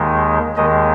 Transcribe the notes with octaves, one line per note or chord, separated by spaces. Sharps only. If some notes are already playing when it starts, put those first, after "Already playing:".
Already playing: D#2 D#3 G#3
D#2 D#3 G#3 D#5